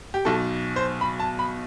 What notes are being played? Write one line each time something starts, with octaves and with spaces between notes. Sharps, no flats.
G4
B1 B2 A4
C5
B5
A5
B5